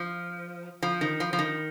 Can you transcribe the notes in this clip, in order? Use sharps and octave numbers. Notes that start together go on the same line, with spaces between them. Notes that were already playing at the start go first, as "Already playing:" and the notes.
Already playing: F3
F3
D#3
F3
F3
D#3